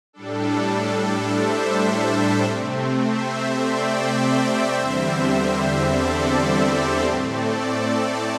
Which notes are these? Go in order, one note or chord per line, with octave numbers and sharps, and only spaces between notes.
A2 G3 D4 A4
A4
C5 E5
C5 E5
C3 A3 C4
C5 E5
D5 G5
C5 E5
E2 D3 G3 C4 C5 E5
A4 D5
A4
G4
A2 A3 C4 G4 C5
A4 D5
A4